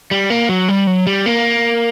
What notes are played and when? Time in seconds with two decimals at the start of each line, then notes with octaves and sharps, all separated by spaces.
0.11 G3
0.30 A#3
0.49 F#3
0.68 G3
0.87 F#3
1.07 G3
1.26 A#3